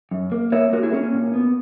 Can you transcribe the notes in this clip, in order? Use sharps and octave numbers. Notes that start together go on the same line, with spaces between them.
F#2
A#3
A#3 C#5 E5
A#3 F#4 A#4
E4 G#4
A#3 C#4
C#4
A#2
B3